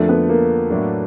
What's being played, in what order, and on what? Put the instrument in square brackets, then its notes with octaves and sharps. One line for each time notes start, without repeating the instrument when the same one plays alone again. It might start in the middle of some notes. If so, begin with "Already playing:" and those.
Already playing: [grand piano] F2 D3 F3 A#3 D4 [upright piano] A3
[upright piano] B3
A#3
[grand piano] A2 F#3 A3 D4